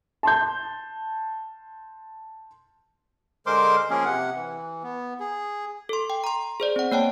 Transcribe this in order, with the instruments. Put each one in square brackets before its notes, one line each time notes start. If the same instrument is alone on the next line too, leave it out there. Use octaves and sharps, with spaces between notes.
[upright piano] A5 C6 G6
[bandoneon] D3 G#3 A#4 C5 C6 D6
F3 A#3 C#4 G#4 A#4
C3 F#5
E3
B3
G#4
[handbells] A4 C6
G5
A#5 C6
G#4 C5 D5
C4 F#5
A#3 C#5 G5 A5